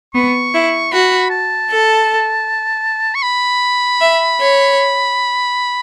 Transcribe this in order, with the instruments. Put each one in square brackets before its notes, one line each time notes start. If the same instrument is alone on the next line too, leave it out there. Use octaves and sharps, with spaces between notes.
[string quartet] B3 [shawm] C#6
[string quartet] E4
[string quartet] F#4 [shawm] B5
[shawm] A5
[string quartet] A4
[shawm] C#6
B5
[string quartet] E5
C#5